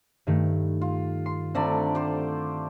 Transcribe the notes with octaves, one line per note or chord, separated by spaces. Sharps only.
G2 D#3 A3
F4
C6
D3 A3 C4 D5 A#5 B5
G4 C5